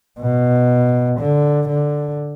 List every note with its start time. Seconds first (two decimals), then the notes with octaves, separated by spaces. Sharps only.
0.20 B2
1.19 D3
1.68 D3